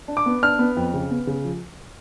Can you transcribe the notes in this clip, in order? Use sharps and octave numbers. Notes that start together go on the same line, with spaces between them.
D4
D6
B3
D4 F6
B3
F2
C#3
B3
C#3
F3